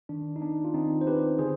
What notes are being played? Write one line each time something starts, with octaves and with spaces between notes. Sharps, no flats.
D#3 D4
D#4
B3 D4
F4
D#3 C4 D#4
C5
B3 G4 B4
D3 G#4 C5